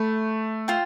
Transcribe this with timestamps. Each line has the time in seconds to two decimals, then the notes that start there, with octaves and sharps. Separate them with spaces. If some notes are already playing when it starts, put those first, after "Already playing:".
Already playing: A3 E5 B5
0.68 F4 C5 G5